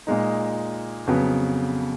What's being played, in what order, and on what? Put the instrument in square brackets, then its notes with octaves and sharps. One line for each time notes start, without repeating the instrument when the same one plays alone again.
[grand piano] A#2 G#3 D#4
F2 C#3 F#3 B3